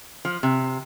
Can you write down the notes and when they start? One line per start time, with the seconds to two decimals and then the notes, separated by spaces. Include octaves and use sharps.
0.25 F3
0.43 C3